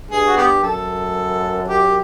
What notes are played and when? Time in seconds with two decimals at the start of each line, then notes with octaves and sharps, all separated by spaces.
0.11 G2 G#4
0.26 F#4
0.37 B3 G4
0.63 F#2 A4
1.68 G4